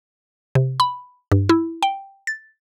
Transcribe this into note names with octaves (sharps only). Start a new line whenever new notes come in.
C3
B5
G2
E4
G5
A6